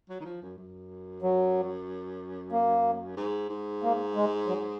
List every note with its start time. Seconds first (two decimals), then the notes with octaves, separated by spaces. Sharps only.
0.09 F#3
0.20 D#3
0.25 F3
0.42 F#2
0.58 F#2
1.22 F#3
2.52 A#3
3.17 G#2
3.50 G#2
3.83 A#3
4.15 G#3
4.47 F#3